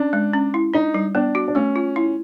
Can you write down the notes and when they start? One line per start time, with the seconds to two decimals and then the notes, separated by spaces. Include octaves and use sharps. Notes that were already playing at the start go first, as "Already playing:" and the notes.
Already playing: C#4 D4
0.13 G#3
0.34 C#4
0.54 E4
0.74 D4 D#4
0.94 G3
1.15 B3 D4
1.35 F#4
1.48 D4
1.55 A3 C#4
1.76 F4
1.96 E4